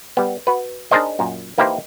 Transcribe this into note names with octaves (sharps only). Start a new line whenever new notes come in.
G3 B3
F#4 B4
D4 D#4 G#4 A#4 C5 D#5
F#2 A#2
E3 A#3 D#4 E4 G4 C5